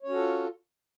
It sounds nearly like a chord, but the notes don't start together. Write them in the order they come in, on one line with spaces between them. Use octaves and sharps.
C#5 C#4 F#4 A4 F4